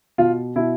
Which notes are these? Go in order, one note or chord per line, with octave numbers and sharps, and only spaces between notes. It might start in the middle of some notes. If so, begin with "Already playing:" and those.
B2 F4
B2 E4